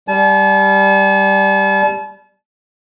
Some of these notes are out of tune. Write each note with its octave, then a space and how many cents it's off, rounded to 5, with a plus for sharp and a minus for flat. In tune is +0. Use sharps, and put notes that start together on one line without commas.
G3 +0 A5 -40